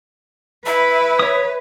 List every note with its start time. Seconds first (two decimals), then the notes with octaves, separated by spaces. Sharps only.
0.66 E4 B4 E5
1.19 C#5 D#6